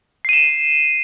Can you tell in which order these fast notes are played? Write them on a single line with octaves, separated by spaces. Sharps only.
C7 D#7 E7